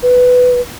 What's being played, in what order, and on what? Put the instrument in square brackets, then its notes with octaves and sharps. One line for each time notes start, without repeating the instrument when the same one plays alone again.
[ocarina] B4